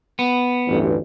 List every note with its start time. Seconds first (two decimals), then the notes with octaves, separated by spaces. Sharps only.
0.19 B3
0.68 A1 D2 G2